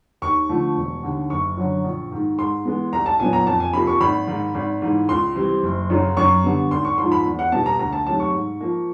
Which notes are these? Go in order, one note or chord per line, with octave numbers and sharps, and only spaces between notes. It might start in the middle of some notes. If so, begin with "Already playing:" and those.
D#2 C#6
D3 F3 A3
E1
D#2 D3
F#1 C#6
F#2 D3 F#3
A#1
G#2 D#3
G#2 C6
E3 G#3 B3
C2 A#5
A5
A#2 F#3 B3 G#5
A#5
F2 A5
G#5
C3 F3 A#3 B5
C#6
G#1 B5
G#2 D#3
G#1
G#2 E3
C#2 C6
C3 E3 G3 C4
F#1
F#2 C#3 F#3
F#2 C#6
D3 G3 B3
G#1 C6
C#6
G#2 F3 C6
B5
E2
F#5
B2 G3 B3 A5
A#5
D2 A#5
A5
C3 D#3 F#3 A3 A5
C#6
G#2
F3 A#3